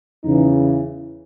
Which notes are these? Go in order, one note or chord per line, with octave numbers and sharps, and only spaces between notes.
E2 C#3 E3 D#4